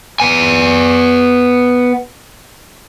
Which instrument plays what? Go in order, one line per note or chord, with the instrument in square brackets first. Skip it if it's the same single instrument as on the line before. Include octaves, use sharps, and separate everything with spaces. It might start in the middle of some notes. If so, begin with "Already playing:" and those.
[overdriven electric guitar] B3 G#5